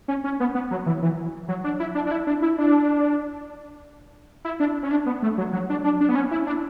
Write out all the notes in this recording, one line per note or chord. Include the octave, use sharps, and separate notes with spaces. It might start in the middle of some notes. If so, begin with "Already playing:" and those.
C#4
C#4
B3
B3
F#3
E3
E3
F#3
D4
E4
D4
D4
E4
D4
E4
D4
E4
D4
C#4
D4
B3
A3
F#3
F#3
D4
D4
D4
B3
C#4
E4
D4